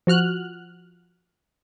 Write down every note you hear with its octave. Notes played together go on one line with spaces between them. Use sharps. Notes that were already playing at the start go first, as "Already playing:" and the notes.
F3 F#4 F6 F#6